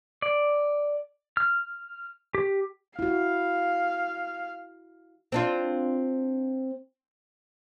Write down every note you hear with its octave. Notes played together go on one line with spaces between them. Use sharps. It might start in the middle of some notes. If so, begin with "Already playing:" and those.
D5
F6
G4
E4 F#4 F5
C4 D4 F4